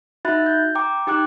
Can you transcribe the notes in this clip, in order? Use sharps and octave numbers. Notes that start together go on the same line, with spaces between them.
D#4 F#4 E5 B5 F#6 A6
G6
G5 A#5 D6
D#4 G4 G5 D6 F#6